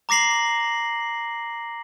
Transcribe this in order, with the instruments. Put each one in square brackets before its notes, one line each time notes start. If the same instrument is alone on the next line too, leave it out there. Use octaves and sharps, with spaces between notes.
[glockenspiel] A#5 D6 A#6 C7 F#7